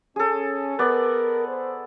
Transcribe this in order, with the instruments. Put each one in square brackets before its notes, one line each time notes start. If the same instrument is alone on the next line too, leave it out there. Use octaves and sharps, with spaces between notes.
[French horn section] C#4 [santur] G#4 A4
[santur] B3 D5 [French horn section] A#4
[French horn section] C5